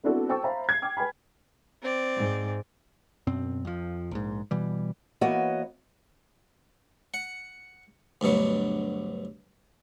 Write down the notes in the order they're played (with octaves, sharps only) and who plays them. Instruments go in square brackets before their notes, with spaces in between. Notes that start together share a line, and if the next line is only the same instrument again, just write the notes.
[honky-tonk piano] B3 C4 D4 E4 F#4 A4
C5 G5 A5 C#6 E6 A6
C5 E5 F5 A#5 B5
G#6 C7
G5 D6 F6
B4 G5 G#5 B5
[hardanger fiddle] C4 D5
[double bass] G#2
[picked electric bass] F#2 B2 C4
F2 F3
A#1 G#2
B2 E3 G3
[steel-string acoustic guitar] E3 A#3 B3 F#4 C#5 D#5
[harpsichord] F#5
D2 G2 B2 F#3